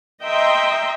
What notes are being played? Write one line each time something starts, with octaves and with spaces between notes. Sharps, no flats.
D#5 E5 G5 A#5 C6